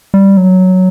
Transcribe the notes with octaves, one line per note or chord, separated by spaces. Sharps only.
G3
F#3